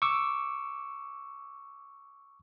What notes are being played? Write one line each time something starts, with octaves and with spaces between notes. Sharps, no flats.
C#6 D6 E6